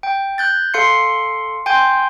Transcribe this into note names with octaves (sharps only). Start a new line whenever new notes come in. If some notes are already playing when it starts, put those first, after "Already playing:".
G5
F#6 G6 A6
A4 F5 C6 C7 C#7
G5 G#5 C6 G6